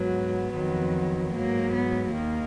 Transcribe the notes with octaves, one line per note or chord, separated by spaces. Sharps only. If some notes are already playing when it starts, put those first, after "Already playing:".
Already playing: G#2 F#3 B3
F2 D#3 F#3
G#2 F#3 A#3
B3
D#2 D#3 A#3